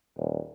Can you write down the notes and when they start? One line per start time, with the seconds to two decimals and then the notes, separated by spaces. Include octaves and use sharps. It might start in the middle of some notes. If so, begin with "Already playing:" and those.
0.17 D#1